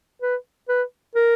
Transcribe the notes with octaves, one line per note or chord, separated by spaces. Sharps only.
B4
B4
A#4